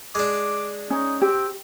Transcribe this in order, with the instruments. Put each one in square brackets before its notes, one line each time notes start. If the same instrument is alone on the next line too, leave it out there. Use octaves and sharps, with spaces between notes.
[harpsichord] G#3 D4 [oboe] D6
[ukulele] C#4 [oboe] D#4
[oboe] C4 [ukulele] G4